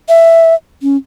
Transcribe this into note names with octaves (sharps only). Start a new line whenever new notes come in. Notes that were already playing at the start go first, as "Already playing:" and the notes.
E5
C#4